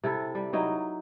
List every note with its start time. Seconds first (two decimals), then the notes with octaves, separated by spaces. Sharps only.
0.04 C3 E4 A4
0.35 G3
0.53 F#3 D#4 E4 D#5